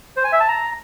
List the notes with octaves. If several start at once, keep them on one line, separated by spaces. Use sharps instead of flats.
C5
G#5
E5
A5
A#5